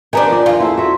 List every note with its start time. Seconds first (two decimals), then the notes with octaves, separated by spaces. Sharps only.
0.13 D#3 B3 D4 G4 B4 C5 G#5 A#5
0.30 F3 D5
0.46 E2 F4
0.60 E4 G#4 A4 C5 C6
0.78 F#4 E5